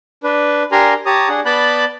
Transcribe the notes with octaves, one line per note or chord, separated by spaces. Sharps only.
D4 B4
D4 G4 A#4 G#5 A#5 C6
G4 C#5 A5 A#5 D#6
D4 G#4 F#5
B3 D5 A5 B5 F#6 G6